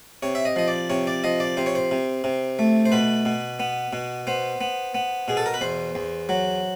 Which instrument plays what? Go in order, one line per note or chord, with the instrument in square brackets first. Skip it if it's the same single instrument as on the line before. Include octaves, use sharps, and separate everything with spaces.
[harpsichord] C3 C#5
E5
D#5
F3 D#5
D5
C3 C#5
D5
F3 D#5
D5
C3 C5
C#5
C5
C3
C3
A3
C5
B2 B4
B2
B3
B2
B3 C5
B3
B3
B2 G#4
A4
A#4
B4
E2 C5
E2
F#3